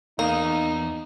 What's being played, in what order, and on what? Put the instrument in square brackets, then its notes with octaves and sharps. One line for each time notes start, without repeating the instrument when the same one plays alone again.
[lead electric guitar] E2 [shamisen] A#3 [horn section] D#4 [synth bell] A#5